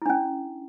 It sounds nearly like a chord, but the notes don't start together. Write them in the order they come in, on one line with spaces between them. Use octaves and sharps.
E4 D4 C#4